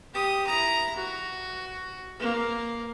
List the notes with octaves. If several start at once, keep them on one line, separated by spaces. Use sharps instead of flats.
G4 D#6
E4 A#5
F#4
A#3